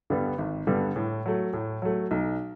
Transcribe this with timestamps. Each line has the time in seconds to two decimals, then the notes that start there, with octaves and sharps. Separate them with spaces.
0.10 G2 D3 G3 B3
0.38 G#1
0.67 G2 D3 G3 B3
0.96 A2
1.26 F#3 A3
1.53 A2
1.82 F#3 A3
2.11 B1